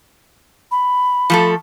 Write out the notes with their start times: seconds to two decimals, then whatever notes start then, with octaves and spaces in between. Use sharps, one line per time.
0.71 B5
1.30 F3 A3 A4